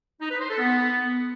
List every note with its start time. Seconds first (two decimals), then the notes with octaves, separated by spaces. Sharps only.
0.21 D#4
0.31 B4
0.40 C5
0.49 A4
0.59 B3